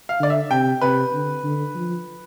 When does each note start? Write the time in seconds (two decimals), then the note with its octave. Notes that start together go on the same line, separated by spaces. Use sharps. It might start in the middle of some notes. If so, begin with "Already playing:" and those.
0.09 F5
0.20 D3 D5
0.30 E5
0.51 C3 G5
0.81 C3 B4
1.13 D3
1.44 D3
1.75 F3